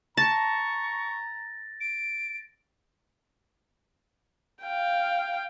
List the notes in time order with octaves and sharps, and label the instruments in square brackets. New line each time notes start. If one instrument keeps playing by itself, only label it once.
[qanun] A5 [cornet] A#5 [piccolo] C#6 [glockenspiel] A6 A#6
[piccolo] D7
[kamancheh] F5 G5